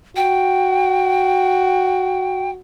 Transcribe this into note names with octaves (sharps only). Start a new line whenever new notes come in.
F#4 G5